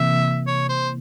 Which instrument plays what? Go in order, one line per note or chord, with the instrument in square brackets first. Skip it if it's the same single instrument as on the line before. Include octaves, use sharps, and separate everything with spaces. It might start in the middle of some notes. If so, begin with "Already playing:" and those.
Already playing: [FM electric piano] C3 E3 A#3 [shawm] E5
[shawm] C#5
C5